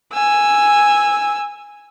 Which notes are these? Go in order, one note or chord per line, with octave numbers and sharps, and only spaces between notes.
G#5 E6